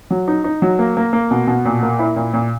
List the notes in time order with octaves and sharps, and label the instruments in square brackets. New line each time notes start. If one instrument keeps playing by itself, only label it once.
[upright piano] F#3
D#4
D#4
F#3
A#3
A#3
A#3
B2
B2
A#2
A#3
E4
A#2
A#2